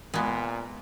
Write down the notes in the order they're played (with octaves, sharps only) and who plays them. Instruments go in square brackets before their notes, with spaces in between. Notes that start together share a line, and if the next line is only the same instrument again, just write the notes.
[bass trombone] A#2 [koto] G#3 B3